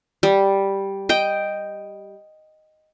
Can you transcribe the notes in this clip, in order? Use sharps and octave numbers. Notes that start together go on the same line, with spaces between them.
G3
D#5 G5